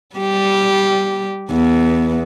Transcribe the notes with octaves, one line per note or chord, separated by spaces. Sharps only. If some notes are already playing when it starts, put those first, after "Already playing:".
G3 G4
E2 B3